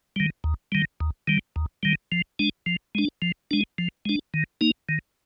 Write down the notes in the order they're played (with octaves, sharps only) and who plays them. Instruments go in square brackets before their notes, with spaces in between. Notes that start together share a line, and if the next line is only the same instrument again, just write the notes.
[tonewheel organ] D#3 G3
D#2
D#3 G3
D#2
D#3 G3
D#2
D#3 G3
F3
G#3 D4
F3
G#3 D4
F3
G#3 D4
F3
G#3 D4
D#3
A#3 D#4
D#3